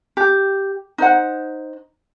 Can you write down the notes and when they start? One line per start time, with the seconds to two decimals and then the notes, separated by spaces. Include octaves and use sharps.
0.17 G4
0.98 D#4 C5 F#5